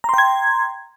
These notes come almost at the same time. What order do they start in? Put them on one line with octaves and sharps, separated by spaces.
A#5 C6 G5 G#6